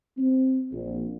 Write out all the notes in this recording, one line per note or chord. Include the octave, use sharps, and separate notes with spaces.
C4
A#1